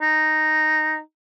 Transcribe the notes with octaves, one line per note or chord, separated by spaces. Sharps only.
D#4